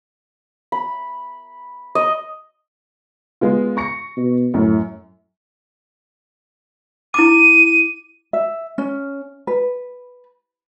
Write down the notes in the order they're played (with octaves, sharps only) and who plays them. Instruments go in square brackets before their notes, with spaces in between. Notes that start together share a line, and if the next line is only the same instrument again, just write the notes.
[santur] B5
D#5
[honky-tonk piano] G#3 B3 F4
C#6 A#6 C#7
[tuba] B2
[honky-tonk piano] F#2 [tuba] A2
[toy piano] E4 D6 [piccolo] D#7
[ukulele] E5
C#4
B4